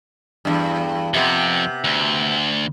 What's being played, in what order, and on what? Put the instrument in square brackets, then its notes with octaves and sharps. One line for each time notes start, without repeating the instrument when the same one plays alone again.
[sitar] E2 G2
[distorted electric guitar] F2 [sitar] C3 B3
[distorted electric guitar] D2